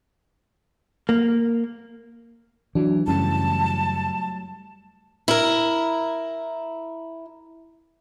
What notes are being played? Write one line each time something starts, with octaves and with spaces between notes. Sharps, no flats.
A#3
E3 F#3 D4
F#2 C#3 E3 F#3 G3 A3 A5
E4 A#4